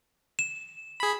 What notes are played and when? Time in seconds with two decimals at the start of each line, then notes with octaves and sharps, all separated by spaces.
0.39 E7
1.00 G#4 B5